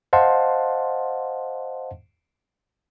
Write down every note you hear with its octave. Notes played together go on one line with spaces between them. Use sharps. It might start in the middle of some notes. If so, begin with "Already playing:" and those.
C5 D#5 F5 F#5 A5 C6